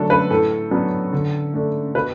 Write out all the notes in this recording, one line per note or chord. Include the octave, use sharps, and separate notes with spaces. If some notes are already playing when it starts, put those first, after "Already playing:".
Already playing: D3 F#3 A3 D4 A4
B4
A2 A4
F#3 B3 D4
D3
A3 D4
B2 B4